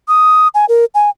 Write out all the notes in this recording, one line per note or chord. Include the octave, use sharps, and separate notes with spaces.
D#6
G#5
A#4
G#5